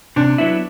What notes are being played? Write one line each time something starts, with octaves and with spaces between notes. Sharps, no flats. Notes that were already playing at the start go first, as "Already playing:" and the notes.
C3 D4
F#3 B3 E4